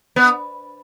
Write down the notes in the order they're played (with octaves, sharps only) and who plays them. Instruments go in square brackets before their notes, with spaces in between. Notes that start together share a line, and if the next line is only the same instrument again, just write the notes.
[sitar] B3